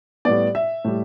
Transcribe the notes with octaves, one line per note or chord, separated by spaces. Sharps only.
A2 G3 B3 D5
E5
A2 G3